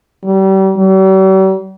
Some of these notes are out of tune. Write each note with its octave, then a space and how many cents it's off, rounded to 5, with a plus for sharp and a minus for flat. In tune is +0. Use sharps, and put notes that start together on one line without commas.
G3 -35
G3 -45